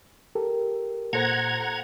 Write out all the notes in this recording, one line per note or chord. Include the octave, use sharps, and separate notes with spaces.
G4 A4 A#4
A#2 A4 C5 F#5 A#5 G#6